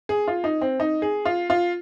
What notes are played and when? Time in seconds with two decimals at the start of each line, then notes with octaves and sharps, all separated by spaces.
0.09 G#4
0.28 F4
0.44 D#4
0.61 C4
0.80 D#4
1.02 G#4
1.25 F4
1.50 F4